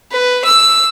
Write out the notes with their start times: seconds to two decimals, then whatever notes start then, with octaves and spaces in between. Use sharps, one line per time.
0.11 B4
0.45 E6